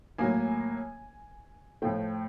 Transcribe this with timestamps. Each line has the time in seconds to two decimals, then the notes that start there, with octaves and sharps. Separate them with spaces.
0.18 A2 F#3 A#3 G#5
1.82 A2 F3 A3 G5